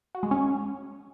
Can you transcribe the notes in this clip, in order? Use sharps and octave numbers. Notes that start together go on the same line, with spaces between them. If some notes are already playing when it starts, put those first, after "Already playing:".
F#4
G#3
C#4